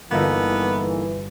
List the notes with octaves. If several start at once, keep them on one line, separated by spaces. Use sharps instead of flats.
G1 E3 A#3 B3 D#4 F4 A4 E5